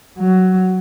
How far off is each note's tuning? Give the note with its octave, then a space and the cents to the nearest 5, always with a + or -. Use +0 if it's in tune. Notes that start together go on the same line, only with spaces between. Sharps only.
F#3 +10